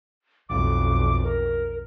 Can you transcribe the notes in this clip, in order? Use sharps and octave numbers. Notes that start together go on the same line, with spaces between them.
B1 F2 D6
A#4